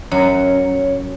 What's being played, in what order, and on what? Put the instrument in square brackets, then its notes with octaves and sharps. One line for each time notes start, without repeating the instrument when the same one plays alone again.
[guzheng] F#2 [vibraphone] C#5